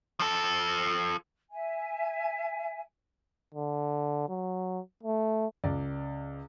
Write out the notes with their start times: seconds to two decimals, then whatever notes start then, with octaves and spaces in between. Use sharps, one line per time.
0.20 F3 A4
1.51 E5 G#5
3.55 D3
4.29 F#3
5.03 A3
5.64 C#2 D5